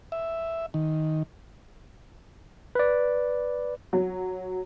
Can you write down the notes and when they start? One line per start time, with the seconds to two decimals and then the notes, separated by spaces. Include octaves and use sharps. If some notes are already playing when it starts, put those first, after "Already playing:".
0.12 E5
0.74 D#3
2.75 B4 D5
3.93 F#3